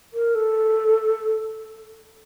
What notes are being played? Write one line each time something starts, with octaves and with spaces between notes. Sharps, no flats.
A#4
A4